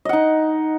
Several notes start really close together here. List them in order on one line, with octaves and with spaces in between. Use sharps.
D#5 F#5 D#4